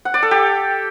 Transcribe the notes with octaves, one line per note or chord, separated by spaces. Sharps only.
F#5
D5
A4
G4